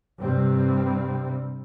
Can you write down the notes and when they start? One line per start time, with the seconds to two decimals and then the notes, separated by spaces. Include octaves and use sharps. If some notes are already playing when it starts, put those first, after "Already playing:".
0.22 G2 C3 G3 C4